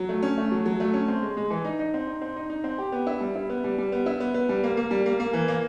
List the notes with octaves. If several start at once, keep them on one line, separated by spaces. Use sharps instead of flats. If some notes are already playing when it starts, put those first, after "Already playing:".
Already playing: F#3
A3
C#4
A3
F#3
F#3
A3
C#4
C4
G#3
G#3
E3
D#4
D#4
C4
D#4
C4
D#4
D#4
C4
G4
B3
E4
G3
E4
B3
G3
G3
B3
E4
B3
B3
G3
A#3
A#3
G3
A#3
A#3
E3
A#3